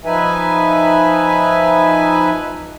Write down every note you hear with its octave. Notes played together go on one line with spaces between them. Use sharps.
F3 D#4 B4 E5 G#5